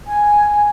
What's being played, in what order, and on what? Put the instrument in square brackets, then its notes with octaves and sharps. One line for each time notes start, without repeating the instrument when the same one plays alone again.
[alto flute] G#5